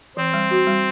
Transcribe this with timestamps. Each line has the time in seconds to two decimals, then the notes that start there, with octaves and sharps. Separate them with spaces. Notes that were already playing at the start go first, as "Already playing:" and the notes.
0.17 E3 C4
0.33 G3
0.51 F#4
0.67 G3